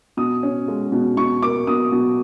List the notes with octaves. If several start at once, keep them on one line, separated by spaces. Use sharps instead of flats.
B2 D#6
C#4
G#3
B2
B2 C#6
A#3 D6
B2 D#6
B2